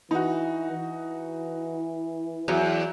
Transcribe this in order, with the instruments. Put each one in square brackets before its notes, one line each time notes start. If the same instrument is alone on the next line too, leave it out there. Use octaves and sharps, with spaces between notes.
[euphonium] E3 [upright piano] D#4 F#4
[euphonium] E3
[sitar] E2 [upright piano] F#3